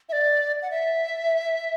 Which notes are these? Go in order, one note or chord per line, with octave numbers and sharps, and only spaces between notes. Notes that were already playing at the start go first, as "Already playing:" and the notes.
E5
D5
F#5
E5